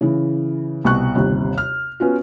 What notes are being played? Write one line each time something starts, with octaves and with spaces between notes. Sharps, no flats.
C#3 E3
C2 B2 C#6 F#6
G1 D#2 C3
F6
B3 C#4 F4 F#4